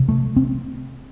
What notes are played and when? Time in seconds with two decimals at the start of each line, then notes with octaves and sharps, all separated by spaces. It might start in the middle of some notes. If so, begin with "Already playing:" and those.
Already playing: C3
0.09 A3
0.36 C4